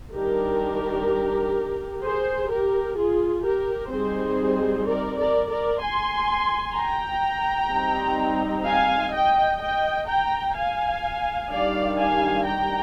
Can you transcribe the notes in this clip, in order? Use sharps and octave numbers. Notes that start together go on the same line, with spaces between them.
D#3 G3 D4 G4 A#4
G#4 C5
G4 A#4
F4 G#4
G4 A#4
G3 C4 D#4 G#4 C5
A#4 D5
A#4 D5
A#4 D5
G#5 C6
G5 A#5
G3 C4 D#4
F5 G#5
D#5 G5
D#5 G5
G5 A#5
F5 G#5
D#3 G3 D4 D5 F5
F5 G#5
G5 A#5